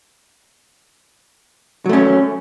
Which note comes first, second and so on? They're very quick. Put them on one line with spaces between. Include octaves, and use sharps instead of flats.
F#3 A3 C#4